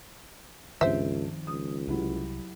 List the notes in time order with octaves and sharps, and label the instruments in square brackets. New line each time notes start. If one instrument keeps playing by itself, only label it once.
[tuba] C#2 [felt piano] G2 [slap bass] D#3 F3 C4 [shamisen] C5 E5
[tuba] C#2 [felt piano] D#6
[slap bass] C2 [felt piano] F#3 E4 G4